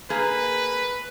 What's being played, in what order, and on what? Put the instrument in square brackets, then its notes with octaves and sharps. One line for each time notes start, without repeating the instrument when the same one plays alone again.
[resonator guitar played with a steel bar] A#3 G#4 [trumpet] B4